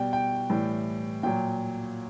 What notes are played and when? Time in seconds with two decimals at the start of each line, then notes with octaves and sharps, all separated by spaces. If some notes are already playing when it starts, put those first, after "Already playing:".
Already playing: B2 G3 G5
0.13 G5
0.50 A2 E3 G3
1.23 A#2 F#3 G5